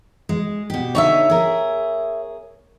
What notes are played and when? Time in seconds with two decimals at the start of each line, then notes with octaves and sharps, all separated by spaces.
0.29 G#3
0.70 B2 G4
0.95 D3 D#4 C#5 D5 E5
1.30 G#4 A#4